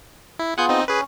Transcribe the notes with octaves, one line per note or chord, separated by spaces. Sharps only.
E4
B3 F4 G#4 F#5 G#5 G6
C4 D#4 D#5
C#4 G#4 B4